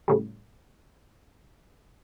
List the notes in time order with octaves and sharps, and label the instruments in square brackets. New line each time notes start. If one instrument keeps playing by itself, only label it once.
[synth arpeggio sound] A2 C#3 G3